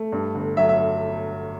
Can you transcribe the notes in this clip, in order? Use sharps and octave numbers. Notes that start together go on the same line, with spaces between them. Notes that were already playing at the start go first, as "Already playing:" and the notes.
Already playing: A3
G2
G1
F#3 E5
E5